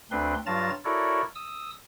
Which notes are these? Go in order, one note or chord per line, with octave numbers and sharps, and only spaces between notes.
D2 C4 D4 B4 C6
G2 F#3 F4 A5 A#5 A6
E4 F#4 A4 A#4 C#5 D5
D#6 E6